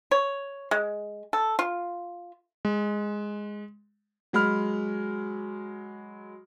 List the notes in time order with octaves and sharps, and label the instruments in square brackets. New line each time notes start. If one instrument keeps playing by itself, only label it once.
[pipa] C#5
G#3
A4
F4
[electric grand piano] G#3
[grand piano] F#3 G#3 B5 F6